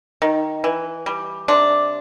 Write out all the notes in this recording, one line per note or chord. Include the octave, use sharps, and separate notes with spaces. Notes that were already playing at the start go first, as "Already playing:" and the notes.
D#3
E3
G3
C3 D4